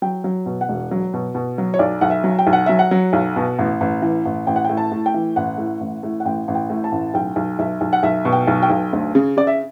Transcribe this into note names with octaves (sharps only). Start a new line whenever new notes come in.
F#3 G5
F#3
B2
F#5
E1
F#3
B2
B2
F#3
C#5
B1 D5
B1 F#5
E5
F#3
G5
B1
F#5
F#3 E5
F#5
F#3
B1
B2
A1
A1
E3
A1
A1 G5
F#5
A2 G5
A5
A2
G5
E3
A1 F#5
A2
A1
A2
F#5
A1 G5
A1
G5
A2
A5
A1
B1 G5
B1
B1 E5
B1
F#5
B1 E5
B2
G5
B1
G5
B1
D2
C#3
C#3 D5
E5